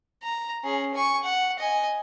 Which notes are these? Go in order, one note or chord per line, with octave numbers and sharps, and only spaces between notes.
A#5
C#4 G#4
G#5 C#6
F#5
D#5 G#5